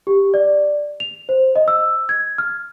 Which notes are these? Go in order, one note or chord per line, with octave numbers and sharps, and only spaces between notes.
G4
D5
F7
C5
D#5
E6
G#6
F6